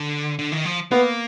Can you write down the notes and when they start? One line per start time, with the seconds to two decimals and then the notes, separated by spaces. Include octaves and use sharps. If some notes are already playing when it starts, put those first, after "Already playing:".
Already playing: D3
0.39 D3
0.52 D#3
0.65 F3
0.91 A#3 B3